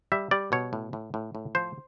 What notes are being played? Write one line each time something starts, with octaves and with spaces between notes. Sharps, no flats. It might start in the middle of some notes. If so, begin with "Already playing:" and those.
G3 E5
G3 D5
B2 C#5
A2
A2
A2
A2
F3 C5